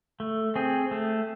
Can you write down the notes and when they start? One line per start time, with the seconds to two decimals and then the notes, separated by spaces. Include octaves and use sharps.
0.20 A3
0.56 C4 G#4
0.91 A3